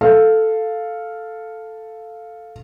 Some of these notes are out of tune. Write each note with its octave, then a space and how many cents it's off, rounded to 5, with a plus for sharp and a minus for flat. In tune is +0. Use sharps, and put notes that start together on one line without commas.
A4 +0 F5 +0